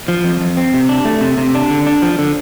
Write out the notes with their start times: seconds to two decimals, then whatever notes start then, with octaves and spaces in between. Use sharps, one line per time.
0.08 F3
0.24 F2
0.41 F2
0.57 C4
0.74 C3
0.89 D4
1.05 A3
1.21 C3
1.38 C3
1.54 D4
1.70 D3
1.86 D4
2.02 F3
2.19 D3